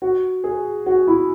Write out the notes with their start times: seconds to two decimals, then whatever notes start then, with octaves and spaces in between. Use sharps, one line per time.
0.02 F#4
0.44 G#4
0.86 F#4
1.07 E4